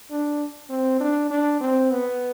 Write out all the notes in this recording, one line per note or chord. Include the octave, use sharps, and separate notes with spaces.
D4
C4
D4
D4
C4
B3